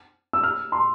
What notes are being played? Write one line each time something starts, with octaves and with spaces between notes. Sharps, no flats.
E6
F6
C6